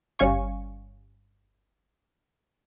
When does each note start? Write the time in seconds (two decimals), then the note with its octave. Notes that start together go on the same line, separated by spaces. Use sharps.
0.19 G1 G3 C#4 F5 G#5 C#6